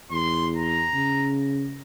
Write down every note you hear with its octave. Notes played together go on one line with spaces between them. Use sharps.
E2 C6
A#5
C#3